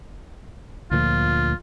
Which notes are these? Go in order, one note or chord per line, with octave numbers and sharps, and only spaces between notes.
D2 A#2 F3 F4